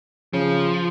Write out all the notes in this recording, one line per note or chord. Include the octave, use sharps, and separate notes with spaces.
C#3 F3